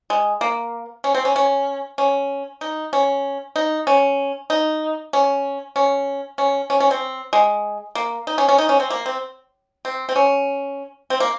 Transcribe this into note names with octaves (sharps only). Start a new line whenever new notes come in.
G#3
A#3
C#4
C4
C#4
C#4
C#4
D#4
C#4
D#4
C#4
D#4
C#4
C#4
C#4
C#4
C#4
C4
G#3
A#3
D#4
C#4
C#4
D#4
C#4
C4
A#3
C4
C4
C4
C#4
C4
A#3